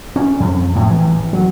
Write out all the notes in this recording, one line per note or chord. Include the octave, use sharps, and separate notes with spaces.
C#4
F2
A2
E3
F#3